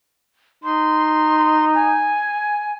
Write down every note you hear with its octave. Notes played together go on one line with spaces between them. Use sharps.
D#4 C6
G#5